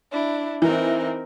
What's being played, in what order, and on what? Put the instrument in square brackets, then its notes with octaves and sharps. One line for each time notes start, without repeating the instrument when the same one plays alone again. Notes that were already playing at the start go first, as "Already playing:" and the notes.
[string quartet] D4 E4
[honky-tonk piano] E3 [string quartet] C4 D#4 A#4